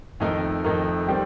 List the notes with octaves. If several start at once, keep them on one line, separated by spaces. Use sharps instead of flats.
F2 D#3 A3 D#4 A#4
F2 D#3 A3 D#4 A#4
D#3 G3 C4 G4